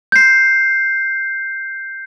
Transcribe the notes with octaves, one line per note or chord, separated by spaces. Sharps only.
G6 C7